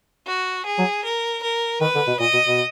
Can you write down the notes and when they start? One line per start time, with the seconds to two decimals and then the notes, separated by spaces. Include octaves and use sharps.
0.27 F#4
0.66 G#4
0.79 F#3
1.04 A#4
1.43 A#4
1.81 D#3 B4
1.95 D3
2.07 B2
2.20 A#2 D#5
2.33 B2
2.46 B2